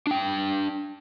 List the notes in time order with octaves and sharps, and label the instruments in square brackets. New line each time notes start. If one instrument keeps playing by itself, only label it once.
[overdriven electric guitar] D4 G5